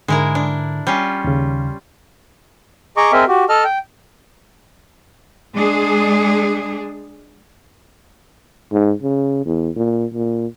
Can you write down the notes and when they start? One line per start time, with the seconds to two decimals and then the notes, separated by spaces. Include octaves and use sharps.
0.08 G#2 D3 G#3 E4 A#4
0.35 D4
0.87 G3 C#4 F4
1.24 D#2 C#3
2.97 G#4 D#5 A#5 C#6 D6
3.12 C4 G#4 A#4 D#5 E5
3.28 F#4 G4
3.49 A4 D#5 A5 F6
3.64 G5
5.54 G#3 D4 G#4
8.72 G#2
9.03 C#3
9.46 E2
9.76 A#2
10.14 A#2